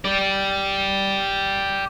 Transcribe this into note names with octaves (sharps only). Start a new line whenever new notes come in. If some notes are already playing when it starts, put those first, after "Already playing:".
G4 D5